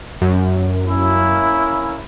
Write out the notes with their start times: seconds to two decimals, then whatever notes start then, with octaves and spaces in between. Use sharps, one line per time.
0.21 F#2
0.87 A#3 C#4 E4